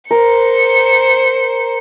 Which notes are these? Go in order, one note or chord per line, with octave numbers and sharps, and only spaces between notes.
A#4 C5 C#7